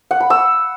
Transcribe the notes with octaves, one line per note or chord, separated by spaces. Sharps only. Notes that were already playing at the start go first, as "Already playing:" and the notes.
F#5
B5
E6